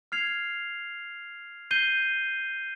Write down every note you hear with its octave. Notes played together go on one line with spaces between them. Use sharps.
F6 G#6 C7 F7
G6 C7 D#7 G7